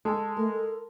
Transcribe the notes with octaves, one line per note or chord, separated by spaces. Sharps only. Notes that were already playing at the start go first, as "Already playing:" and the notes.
G#3 A4
A3 A#4
A4